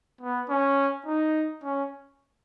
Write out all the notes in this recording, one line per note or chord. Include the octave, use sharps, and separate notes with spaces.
B3
C#4
D#4
C#4